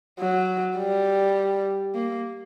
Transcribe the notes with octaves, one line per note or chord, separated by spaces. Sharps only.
F#3
G3
A#3